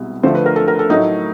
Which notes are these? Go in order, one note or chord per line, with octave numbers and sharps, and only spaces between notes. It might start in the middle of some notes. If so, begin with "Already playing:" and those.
Already playing: C2 B2 G#3
D2 D3 F3 A3 C5
B4
A#4
A4
A#4
A4
A2 F#3 A3 D#4